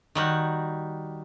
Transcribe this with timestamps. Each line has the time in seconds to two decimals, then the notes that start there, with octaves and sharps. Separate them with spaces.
0.15 D#3 G3 F#4